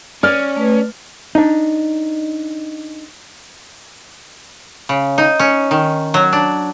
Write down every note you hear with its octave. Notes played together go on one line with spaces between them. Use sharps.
C#4 D5 F6
A3 B4
D4 D#4
C#3
D#4
C#4
D#3
F#3
D4